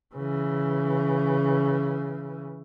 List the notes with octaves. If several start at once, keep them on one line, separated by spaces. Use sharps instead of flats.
C#3 E3